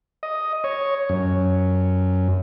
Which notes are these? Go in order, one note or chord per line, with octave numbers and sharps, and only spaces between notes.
D#5
C#5
F#2